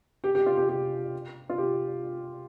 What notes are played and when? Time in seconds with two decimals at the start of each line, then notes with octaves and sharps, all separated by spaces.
0.24 G4
0.35 G4
0.46 F4
0.57 G4
0.69 G4
1.50 F4
1.58 G4